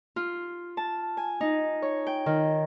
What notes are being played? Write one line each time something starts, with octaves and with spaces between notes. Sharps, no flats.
F4
A5
G#5
D#4
C#5
G5
D#3